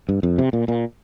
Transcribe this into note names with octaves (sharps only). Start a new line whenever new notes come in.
G2
F2
C3
A#2
A#2